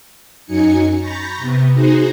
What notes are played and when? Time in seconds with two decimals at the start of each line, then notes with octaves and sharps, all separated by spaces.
0.45 F#2 F#3 D#4 G#5 C#7
0.98 A#5 B5 C#6 G6 A6 A#6
1.37 C3 B3
1.74 D#4 F#4 G#4 C5